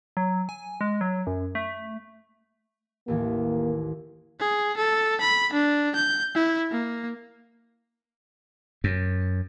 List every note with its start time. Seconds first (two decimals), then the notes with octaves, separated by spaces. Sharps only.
0.17 F#3
0.49 G#5
0.81 G#3
1.01 F#3
1.27 F#2
1.55 A3
3.08 A1 D#2 E3 A#3
4.39 G#4
4.77 A4
5.20 B5
5.53 D4
5.95 G6
6.35 E4
6.71 A#3
8.84 F#2